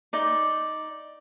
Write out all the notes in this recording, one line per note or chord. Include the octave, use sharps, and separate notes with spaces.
D#4 D5